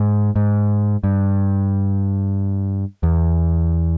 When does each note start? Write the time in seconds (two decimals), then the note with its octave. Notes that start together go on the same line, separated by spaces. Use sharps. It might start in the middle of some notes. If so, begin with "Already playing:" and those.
Already playing: G#2
0.36 G#2
1.04 G2
3.03 E2